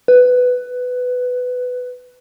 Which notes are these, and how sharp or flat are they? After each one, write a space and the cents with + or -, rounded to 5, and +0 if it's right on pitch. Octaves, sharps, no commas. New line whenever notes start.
B4 +10